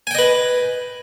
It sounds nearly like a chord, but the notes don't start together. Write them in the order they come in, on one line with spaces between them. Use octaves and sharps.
G#5 G5 D#5 B4